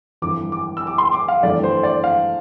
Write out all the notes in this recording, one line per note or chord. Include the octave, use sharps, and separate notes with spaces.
G1 F2 E3 D6
D6
E6
D6
C6
D6
F5
G1 F2 E3 A3 D4 D5
C5
D5
F5